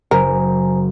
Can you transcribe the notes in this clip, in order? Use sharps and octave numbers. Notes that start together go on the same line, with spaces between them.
F#1 A#4 C5 G#5 A#5